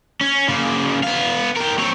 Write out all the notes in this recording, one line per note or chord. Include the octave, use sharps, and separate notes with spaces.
C#4
C#3 A#3
B3 F5
G4 A#4
C4 C#5